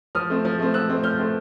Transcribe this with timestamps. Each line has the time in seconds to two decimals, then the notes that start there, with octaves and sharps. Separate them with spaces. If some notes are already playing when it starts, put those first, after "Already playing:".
0.15 F3 D#6 F6
0.30 A3 C4
0.45 F3
0.59 A3 C4
0.74 F3 E6 F#6
0.89 A3 C4
1.03 F3 F6 G6
1.18 A3 C4